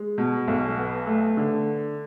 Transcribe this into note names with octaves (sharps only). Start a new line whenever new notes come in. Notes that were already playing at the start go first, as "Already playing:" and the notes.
Already playing: G#3
B2
B1
B3
A3
D3